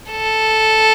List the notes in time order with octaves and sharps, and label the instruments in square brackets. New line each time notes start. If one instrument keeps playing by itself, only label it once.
[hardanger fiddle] A4